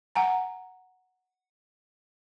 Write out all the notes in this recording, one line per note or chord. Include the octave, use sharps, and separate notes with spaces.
F#5 G#5 A#5